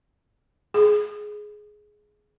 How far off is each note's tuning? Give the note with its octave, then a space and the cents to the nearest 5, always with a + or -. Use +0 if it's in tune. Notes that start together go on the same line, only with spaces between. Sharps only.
G#4 +10